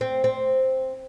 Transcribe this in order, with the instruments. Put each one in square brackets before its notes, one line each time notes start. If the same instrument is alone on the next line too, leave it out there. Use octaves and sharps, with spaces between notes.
[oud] C4
C4